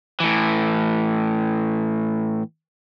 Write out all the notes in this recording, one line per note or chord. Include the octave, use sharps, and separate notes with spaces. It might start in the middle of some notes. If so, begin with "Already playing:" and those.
A2 E3